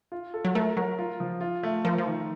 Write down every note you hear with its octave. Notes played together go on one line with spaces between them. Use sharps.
F4
A4
F#3
A3 A#4
F#3 A#4
F4
F3
F4
A3
F3 A#4
F3
D#3